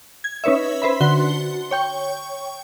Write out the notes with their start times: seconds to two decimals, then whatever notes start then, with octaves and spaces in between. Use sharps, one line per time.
0.24 G#6
0.44 C#4 D#4 B4 C#5 E5
0.82 B4 C5 E5 B5
1.00 D3 F#4 C6 G7
1.71 C#5 G5 C#6